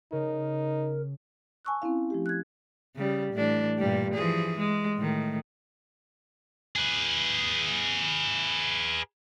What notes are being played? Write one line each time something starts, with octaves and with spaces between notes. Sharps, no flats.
C#3 D#4 A#4
G#5 A5 C#6 E6 F#6
C4 C#4 E4 F5
F3 A3 G4
F#6 G#6
C#3 G3
A2 E3 D4
G2 A#2 G3
E3 F3 G#4
G#3
A2 D#3
G#4 B4